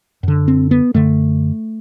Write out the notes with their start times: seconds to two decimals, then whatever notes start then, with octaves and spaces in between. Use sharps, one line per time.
0.23 F#2 D3
0.48 C4
0.71 B3
0.94 F#2 D3 A3